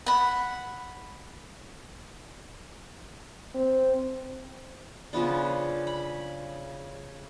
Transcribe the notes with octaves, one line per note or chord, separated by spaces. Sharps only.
F#5 B5
C4
C#3 F3 B3 D4
B5